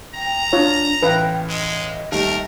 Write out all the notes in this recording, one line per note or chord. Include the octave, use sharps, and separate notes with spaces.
G5 A#5
D4 F4 C#5
A1 E4 B4 F5 G5
G#3 D#5
D#2 G3 A3 A#4